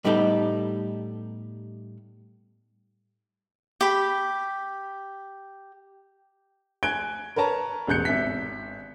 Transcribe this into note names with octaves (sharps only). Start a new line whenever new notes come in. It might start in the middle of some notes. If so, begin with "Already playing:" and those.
A2 G3 B3 D#4 F#4 A4
G4 B5
G#5 F#6 G#6 D7 G7
A#4 B4 C#5 A5 A#5
E1 A1 F#6 G6 C#7
G#1 E5 B6